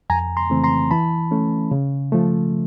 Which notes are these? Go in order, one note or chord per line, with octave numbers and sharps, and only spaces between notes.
F2 G#5 A#5
A#5 C6
C#3 E3 A3 C4
A#5 C6
E3 A5 B5
A3 C#4
C#3
F3 A3